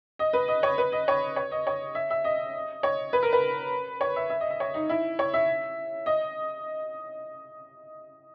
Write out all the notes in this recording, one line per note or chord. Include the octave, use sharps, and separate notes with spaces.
D#5
B4
D#5
C#5
B4
D#5
C#5
C#5
D#5
C#5
E5
E5
D#5
C#5
B4
A#4
B4
C#5
E5
E5
D#5
E5
C#5
D#4
E4
C#5
E5
D#5